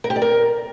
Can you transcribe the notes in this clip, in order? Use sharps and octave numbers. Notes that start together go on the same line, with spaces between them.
A#4
G4
D5
A#4